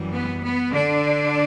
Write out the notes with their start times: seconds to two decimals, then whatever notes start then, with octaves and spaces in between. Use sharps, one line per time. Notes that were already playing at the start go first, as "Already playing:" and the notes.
Already playing: F#2 E3 G3
0.14 B3
0.44 B3
0.74 D3 D4